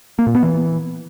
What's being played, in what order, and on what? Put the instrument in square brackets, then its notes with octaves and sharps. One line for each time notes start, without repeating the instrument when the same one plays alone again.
[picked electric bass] A#3
A#2
B3
E3